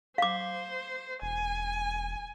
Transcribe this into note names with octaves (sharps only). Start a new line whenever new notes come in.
C5 F5 D6
E1 G#5